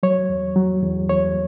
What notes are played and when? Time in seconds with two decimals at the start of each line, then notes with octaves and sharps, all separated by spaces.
0.03 F#3 C#5
0.29 E2
0.56 F#3
0.83 E2
1.09 E2 C#5